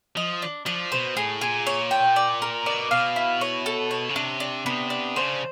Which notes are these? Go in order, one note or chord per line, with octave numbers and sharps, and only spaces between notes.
F3 D#5
D4
F3 D4
B2 C5
A2 G#4
A#2 G#4
C#5
G5
D5
A#4
B2 D5
B2 F5
E4
C#5
A4
C#5
C#3
C3 D4
D4
C3 B3
D4
C#3 C5